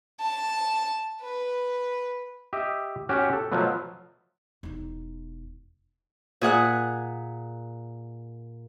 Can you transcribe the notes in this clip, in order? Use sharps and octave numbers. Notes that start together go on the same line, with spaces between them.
A5
B4
G4 D#5 E5
C#4 F#4 G4
A4
B2 F3 F#3 A3 B3
E1 D#4
A#2 G#4 F#5 F#6